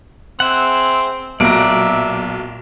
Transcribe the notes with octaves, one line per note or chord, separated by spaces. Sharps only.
C4 G#4 E5 F#5
B1 A#2 F#4 D5 E5 A#5 D7